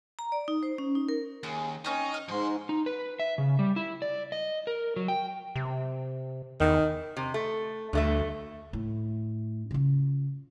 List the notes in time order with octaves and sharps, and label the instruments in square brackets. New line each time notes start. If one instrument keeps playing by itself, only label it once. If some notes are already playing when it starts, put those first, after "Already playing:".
[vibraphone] A#5
D5
D#4
C5
C#4
D#4
A#4
[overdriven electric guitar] D#2 [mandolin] G#4
[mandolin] C4 C#4 D#5 [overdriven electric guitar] D#4
[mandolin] F6
[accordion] G#2 [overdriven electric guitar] F3 C6
[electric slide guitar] D#4
B4
E5
C#3
G3
E4
D5
D#5
A#4
F#3
G5
[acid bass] C3
[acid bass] E2 [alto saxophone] D#3
[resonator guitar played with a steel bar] C3
A3
[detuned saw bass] D2 [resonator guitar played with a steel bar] G2 A3 E5
[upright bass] A2
C#3 F4